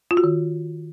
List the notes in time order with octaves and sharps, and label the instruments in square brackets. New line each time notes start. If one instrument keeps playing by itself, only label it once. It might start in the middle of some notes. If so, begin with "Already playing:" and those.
[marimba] F4
F#4
D#3